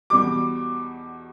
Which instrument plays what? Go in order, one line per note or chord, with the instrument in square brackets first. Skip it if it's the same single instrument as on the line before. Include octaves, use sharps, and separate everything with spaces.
[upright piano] E2 B2 G3 D6